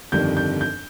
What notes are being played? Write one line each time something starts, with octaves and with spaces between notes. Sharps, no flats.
G1 F2 D#3 G3 G6
G6
G6